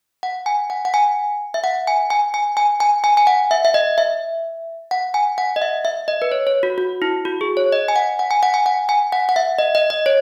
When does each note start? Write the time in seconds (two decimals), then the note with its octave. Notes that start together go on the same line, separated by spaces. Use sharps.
0.23 F#5
0.46 G#5
0.70 F#5
0.85 F#5
0.94 G#5
1.54 E5
1.64 F#5
1.87 G#5
2.10 G#5
2.34 G#5
2.57 G#5
2.80 G#5
3.04 G#5
3.17 G#5
3.27 F#5
3.51 E5
3.65 E5
3.74 D#5
3.98 E5
4.91 F#5
5.14 G#5
5.38 F#5
5.56 D#5
5.62 E5
5.85 E5
6.08 D#5
6.22 B4
6.32 C#5
6.47 C#5
6.63 F#4
6.78 F#4
7.02 E4
7.25 F#4
7.41 G#4
7.57 C#5
7.72 D#5
7.88 G#5
7.96 F#5
8.19 F#5
8.31 G#5
8.43 F#5
8.54 G#5
8.66 F#5
8.89 G#5
9.12 F#5
9.29 F#5
9.36 E5
9.59 D#5
9.75 D#5
9.90 D#5
10.06 C#5